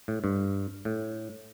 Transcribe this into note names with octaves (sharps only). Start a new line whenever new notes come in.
A2
G2
A2